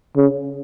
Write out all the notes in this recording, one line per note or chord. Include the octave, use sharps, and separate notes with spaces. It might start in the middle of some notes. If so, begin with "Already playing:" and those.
C#3